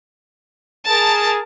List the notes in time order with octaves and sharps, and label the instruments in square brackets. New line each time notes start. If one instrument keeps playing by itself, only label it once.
[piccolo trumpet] G#4 [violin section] A#4 A5